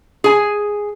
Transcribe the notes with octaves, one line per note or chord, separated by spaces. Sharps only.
G#4 G#5